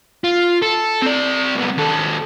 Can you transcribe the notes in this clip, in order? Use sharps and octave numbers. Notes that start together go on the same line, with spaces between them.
F4
A4
C4 D5
C2 B3
D#2 A4